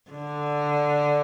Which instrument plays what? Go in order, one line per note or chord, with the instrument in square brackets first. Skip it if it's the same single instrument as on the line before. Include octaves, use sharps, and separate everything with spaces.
[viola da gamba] D3